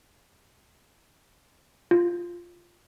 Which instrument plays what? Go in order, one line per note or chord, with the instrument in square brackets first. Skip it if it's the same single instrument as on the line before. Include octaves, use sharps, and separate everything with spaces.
[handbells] F4